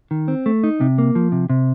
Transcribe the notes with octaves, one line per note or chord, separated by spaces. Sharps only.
D#3
C4
A3
D#4
C3
A#3
F3
C3
C3